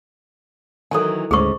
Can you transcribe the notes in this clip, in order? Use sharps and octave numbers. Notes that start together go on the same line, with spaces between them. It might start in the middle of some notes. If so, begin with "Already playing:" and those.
D#3 E3 F#3 A4 G#5
D2 G#2 C#3 G#4 C#6